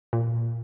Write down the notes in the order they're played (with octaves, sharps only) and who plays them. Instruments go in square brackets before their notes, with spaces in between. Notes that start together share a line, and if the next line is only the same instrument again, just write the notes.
[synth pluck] A#2